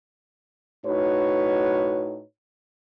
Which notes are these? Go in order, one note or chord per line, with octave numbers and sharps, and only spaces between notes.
A2 D#4 F#4 B4 C#5